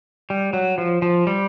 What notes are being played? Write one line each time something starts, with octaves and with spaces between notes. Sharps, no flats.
G3
F#3
F3
F3
G3